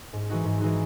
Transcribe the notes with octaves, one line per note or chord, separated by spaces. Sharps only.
G#2
E3 G#3 D#4 F#4
G#2
E3 G#3 D#4 F#4